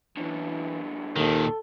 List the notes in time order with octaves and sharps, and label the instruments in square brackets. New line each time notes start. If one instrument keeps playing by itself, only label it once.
[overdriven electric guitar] F#2 D3 [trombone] E3
[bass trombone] D#2 [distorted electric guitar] A#2 D#3 [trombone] A4